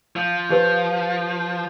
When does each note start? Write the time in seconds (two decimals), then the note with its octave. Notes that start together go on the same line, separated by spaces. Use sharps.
0.16 F3
0.50 F3 G4 B4 C5